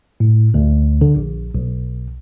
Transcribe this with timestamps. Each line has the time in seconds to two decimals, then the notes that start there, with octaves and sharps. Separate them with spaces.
0.20 A2
0.54 D2
1.01 D3
1.16 A#1
1.55 B1